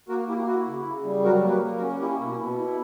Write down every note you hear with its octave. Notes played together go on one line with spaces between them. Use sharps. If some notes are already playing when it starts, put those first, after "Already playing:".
A#3 F#4 A#4
A#3 E4 G4
E4 F#4
C#3
C#3
G3
F#3 F#4 A#4
A#3
G4 B4
A#3
F#4 A#4
C#4
A#3 E4 G4
B2 E4
B2 E4
E4